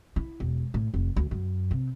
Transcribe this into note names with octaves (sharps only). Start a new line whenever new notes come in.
E4
E1
A2
F1
D2
F#2
C3